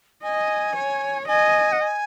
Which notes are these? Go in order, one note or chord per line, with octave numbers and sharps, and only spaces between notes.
D#5 G#5
C#5
D#5 G#5
F#5
G#5